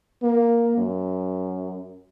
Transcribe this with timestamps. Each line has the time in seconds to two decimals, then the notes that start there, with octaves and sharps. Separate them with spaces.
0.22 A#3
0.78 F#2